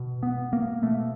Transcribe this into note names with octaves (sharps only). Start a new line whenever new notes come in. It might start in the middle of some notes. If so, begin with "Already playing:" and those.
Already playing: B2
B3
A#3
B2 A3